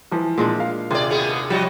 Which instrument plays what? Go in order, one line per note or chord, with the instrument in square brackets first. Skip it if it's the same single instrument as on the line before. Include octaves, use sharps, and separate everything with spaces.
[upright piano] E3 F3
[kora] A#2 G#3 D4
[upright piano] F5
[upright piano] D#2 C3 [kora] F4 [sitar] G#4 D5
[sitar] B2 B3 G#4
[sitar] F3 F#4 D#5 [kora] G3